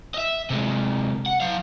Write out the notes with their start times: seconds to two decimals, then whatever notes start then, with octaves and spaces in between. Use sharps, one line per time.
0.15 D#5 E5
0.50 C3 G#3
1.26 F#5
1.40 F#3 F5